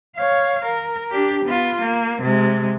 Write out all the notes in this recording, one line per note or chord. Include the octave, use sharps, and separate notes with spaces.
C#5 F5
A#4
D4 G4
B3 F4
A#3
C3 G#3